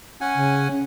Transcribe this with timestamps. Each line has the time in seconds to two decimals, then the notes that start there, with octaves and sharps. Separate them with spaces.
0.21 C#4 F#5 G#5
0.35 C#3
0.71 C#4